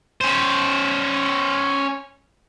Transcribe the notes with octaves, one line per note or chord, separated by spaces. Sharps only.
C#4 C5